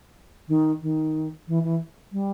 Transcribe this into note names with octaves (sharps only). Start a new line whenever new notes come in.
D#3
D#3
E3
E3
G3